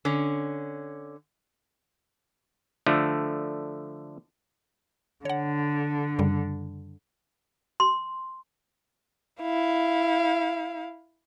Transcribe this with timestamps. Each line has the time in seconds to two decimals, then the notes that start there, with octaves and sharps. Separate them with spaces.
0.05 D3 C#4
2.86 D3 F3 A3
5.25 D3 C#5 F#5
6.19 F#2 C#3 G3
7.80 C6
9.41 E4 F5